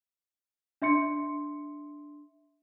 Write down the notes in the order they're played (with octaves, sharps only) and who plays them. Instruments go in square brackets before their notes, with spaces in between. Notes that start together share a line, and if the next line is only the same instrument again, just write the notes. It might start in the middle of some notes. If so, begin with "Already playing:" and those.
[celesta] D4 E5 C6 C#7